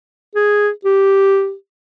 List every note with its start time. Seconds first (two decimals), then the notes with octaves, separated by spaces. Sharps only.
0.36 G#4
0.85 G4